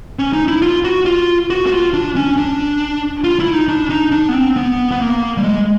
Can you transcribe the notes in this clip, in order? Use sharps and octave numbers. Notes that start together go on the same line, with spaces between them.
C#4
D#4
E4
F4
F#4
F4
F#4
F#4
F4
D4
C#4
D4
F4
E4
D#4
D4
D#4
D4
B3
C4
B3
B3
A#3
G3
G#3